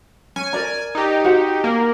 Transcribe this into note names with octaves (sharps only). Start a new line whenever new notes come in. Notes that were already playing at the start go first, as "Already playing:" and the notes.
C#4 G#5
A#4 D5 A#5
D#4 G4
F#4 C5 F#5
A#3